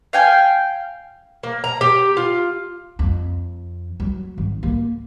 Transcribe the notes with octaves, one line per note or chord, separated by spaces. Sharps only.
F5 G5 G#5
A#3
A#5
G4
F4
F2
F#3
G#1
A#3